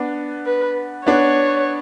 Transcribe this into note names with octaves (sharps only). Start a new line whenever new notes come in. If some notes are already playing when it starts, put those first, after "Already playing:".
Already playing: B3 D4
B4
B3 D4 C#5